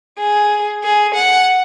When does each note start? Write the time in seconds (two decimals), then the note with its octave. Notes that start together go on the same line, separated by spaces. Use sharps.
0.18 G#4
0.84 G#4
1.15 F#5